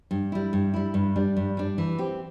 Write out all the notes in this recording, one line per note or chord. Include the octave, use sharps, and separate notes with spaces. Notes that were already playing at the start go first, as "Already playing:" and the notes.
G2
G3 E4
G2
G3 E4
G2
G3 D4
G2
G3 D4
E3
C4 G4